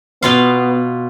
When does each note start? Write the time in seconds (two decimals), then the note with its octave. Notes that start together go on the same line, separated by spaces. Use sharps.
0.22 B2 B3 F4 F5